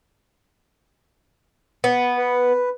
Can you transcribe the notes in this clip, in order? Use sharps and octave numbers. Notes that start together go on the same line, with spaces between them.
B3
B4